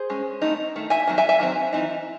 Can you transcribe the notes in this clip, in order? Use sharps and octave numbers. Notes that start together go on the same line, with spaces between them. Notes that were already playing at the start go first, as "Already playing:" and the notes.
Already playing: G#4 C5
G#3 C#4
D#3 A3 C4 D#4
D#3 A3
E5 G#5
D#3 F#3 C4
E5 G#5
E5 G#5
D#3 F#3 C4
E3 C4 D#4